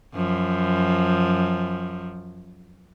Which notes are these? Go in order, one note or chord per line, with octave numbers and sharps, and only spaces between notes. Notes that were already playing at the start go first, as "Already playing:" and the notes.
F#2 F3